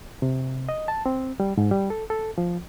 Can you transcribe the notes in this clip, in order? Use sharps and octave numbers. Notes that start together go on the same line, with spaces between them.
C3
D#5
A5
C4
G3
G#2
G3
A4
A4
F3